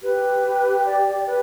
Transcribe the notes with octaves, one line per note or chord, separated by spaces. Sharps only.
G4 B4
D5
B4